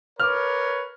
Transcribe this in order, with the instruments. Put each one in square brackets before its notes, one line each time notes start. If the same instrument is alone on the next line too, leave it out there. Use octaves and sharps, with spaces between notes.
[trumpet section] A#4 B4 C#5 [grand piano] D6 F6